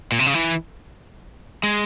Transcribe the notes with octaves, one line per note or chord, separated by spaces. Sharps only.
A#2
C3
C#3
E3
G#3